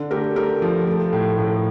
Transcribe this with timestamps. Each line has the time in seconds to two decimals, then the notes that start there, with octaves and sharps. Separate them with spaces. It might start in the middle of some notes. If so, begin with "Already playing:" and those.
Already playing: D3
0.11 A3 G4 A#4
0.36 A3 G4 A#4
0.62 F3
0.87 A3
1.13 A2
1.38 A2